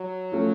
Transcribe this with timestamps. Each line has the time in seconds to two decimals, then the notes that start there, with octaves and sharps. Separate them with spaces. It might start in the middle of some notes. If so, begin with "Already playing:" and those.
Already playing: F#3
0.32 F3 A3 C#4